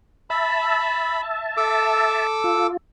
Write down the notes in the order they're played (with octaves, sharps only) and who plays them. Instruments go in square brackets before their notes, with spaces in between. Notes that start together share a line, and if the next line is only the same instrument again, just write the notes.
[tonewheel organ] E5 A5 [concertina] B5
[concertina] A4 D6 E6
[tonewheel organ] F4